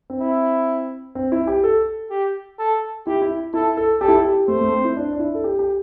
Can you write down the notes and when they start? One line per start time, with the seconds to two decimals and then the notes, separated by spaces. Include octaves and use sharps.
0.10 C4
0.21 E4
1.15 C4
1.32 E4
1.47 G4
1.64 A4
2.10 G4
2.59 A4
3.07 E4 G4
3.22 E4
3.54 E4 A4
3.77 A4
4.01 G4 A4
4.08 E4
4.15 G4
4.25 G4
4.48 A3 C5
4.61 A3
4.72 C4
4.85 E4
4.97 D4
5.13 D4
5.19 E4
5.35 A4
5.44 G4
5.59 G4